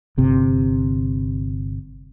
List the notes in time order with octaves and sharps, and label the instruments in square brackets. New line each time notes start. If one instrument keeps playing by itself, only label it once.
[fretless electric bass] G1 C3